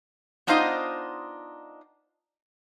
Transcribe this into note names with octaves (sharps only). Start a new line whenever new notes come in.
B3 D4 D#4 F4 C5 D#5